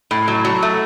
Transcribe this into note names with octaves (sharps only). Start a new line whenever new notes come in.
A2
F#3
F#3
A3